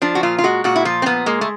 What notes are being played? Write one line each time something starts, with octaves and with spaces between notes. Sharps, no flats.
F3 D4
F#4
A#2 F4
F4
G#3 F#4
A#2 F#4
E4
F3 F4
C4
A#2 B3
G#3 A#3
A3